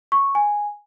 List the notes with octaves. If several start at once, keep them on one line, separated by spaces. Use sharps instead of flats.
C#6
G#5